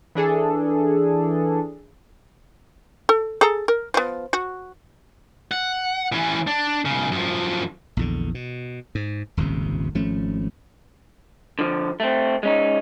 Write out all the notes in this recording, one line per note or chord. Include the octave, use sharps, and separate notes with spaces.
E3 D4 G#4 A4
A4
G#4 A4 A#5
A#4
F3 B3
F#4
F#5
E3 C#4
D4
B1 C#3
F#2 F3
A#1 E2 D3
B2
G#2
D#1 G#1 C#2 C3
G#1 F3 A3 C#4
D3 F3
A3 C4
G#3 C#4 D#4